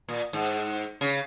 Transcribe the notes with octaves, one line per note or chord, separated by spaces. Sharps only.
A#2
G#2
C#3